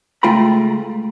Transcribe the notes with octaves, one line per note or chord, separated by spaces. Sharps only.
C#2 A3 F4 G5 A#5 B5